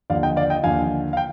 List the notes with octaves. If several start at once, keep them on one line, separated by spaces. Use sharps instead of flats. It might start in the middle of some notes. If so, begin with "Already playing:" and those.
D#2 D3 F3 D5 F5
D#5 G5
D5 F5
D#5 G5
D#2 D3 F3 F5 G#5
F5
G5